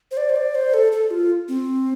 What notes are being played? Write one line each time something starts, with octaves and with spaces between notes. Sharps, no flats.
C5
D5
C5
D5
C5
A4
A4
F4
C4